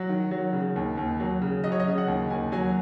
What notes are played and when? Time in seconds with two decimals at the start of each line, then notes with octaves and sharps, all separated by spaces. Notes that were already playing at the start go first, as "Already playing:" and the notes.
Already playing: F#3 F#5
0.09 D#3
0.31 F#3
0.53 C#3
0.76 D#2
0.97 D#2
1.20 F#3
1.42 C#3
1.64 F#3 D#5
1.72 C#5
1.80 D#5
1.87 C#3
1.98 F#5
2.08 D#2
2.30 D#2 G#5
2.52 F#3 G#5